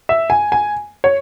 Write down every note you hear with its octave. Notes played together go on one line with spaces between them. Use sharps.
E5
G#5
G#5
C#5